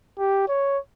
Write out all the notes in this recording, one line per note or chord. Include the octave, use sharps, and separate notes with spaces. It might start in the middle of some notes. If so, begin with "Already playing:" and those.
G4
C#5